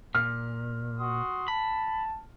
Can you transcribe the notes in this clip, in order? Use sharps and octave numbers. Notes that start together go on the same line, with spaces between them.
A#2 F6
F#4 C6 D#6
A5 B5